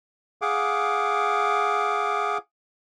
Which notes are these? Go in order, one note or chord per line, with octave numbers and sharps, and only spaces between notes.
G#4 F5 F#5 D6